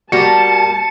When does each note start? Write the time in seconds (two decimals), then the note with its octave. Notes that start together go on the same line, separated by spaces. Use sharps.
0.12 G3 A#3 F#4 A5 C#7